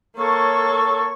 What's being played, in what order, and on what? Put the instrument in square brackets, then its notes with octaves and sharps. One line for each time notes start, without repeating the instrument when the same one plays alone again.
[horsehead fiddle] A#3 A4 [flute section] C#5 C#6